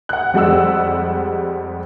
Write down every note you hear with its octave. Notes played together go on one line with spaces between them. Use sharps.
F#5 F#6
F2 G3 G#3 F#5 E6